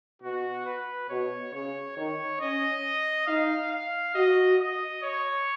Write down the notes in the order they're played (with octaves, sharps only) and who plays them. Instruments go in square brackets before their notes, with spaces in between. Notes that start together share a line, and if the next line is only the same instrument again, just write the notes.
[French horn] B2 [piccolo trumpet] F#4
[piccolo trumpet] B4
[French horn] B2 [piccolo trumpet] C#5
[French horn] C#3 [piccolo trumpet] C#5
[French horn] D#3 [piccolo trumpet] C#5
[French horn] C#4 [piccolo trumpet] D#5
[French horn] D#4 [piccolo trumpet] F5
[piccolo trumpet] F5
[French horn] F#4 [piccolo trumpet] D#5
[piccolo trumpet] D#5
C#5